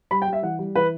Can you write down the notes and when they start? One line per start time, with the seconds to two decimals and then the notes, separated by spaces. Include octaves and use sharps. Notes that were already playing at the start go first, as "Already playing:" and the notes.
0.11 G3 B5
0.22 G5
0.28 G3
0.33 E5
0.43 E3 F#5
0.59 G3
0.75 E3 B4